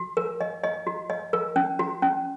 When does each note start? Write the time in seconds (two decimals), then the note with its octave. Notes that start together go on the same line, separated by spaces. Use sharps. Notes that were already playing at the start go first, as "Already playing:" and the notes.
Already playing: F#4
0.17 A#4
0.41 D#5
0.64 D#5
0.87 F#4
1.10 D#5
1.33 A#4
1.56 C#4
1.79 F#4
2.02 C#4